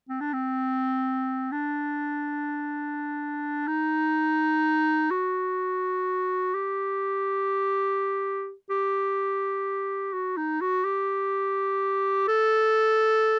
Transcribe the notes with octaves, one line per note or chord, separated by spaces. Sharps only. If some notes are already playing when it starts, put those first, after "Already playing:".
C4
D4
C4
D4
D#4
F#4
G4
G4
F#4
D#4
F#4
G4
A4